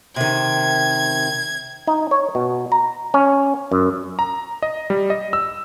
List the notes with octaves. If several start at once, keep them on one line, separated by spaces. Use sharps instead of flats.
C3 D#3 G#6
D#4
C#5
B2
A#5
C#4
F#2
A#5
D#5
G3
D#5
E6